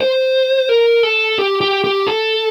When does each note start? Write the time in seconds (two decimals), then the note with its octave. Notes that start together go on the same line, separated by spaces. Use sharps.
0.01 C5
0.69 A#4
1.03 A4
1.39 G4
1.61 G4
1.84 G4
2.07 A4